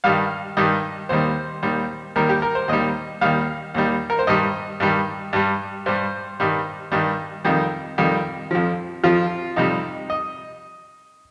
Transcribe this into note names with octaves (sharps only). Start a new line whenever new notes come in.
G2 D#3 G3 F5
G2 D#3 G3 D#5
D#2 D#3 G3 C5
D#2 D#3 G3
D#2 D#3 G3 A#4
G4
A#4
C5
D#2 D#3 G3 D#5
D#2 D#3 G3 F5
D#2 D#3 G3
A#4
C5
G2 D#3 G3 D#5
G2 D#3 G3
G2 G3
G2 G3 C5
G2 D#3 G3
G2 D#3 G3
F2 D#3 G3
F2 D#3 G3
F2 F3
F2 F3 F4
F2 C3 G3 D#4
D#5